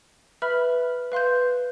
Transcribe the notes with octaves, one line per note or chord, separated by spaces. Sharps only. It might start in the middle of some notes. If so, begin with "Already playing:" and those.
B4 E5 B5 F6
B4 F5 C6 G6